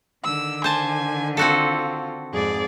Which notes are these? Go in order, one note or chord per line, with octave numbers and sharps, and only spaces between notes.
D3 D#3 E6
C5 G#5 A5
C4 F4 F#4 A4
F2 G#2 G#4 D5